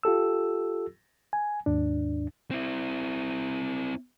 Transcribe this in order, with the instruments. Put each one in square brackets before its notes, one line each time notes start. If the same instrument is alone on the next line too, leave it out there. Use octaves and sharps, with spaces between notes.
[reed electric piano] F4 G4 A4 E6
G#5
D#2 G#2 D4
[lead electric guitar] C4 E4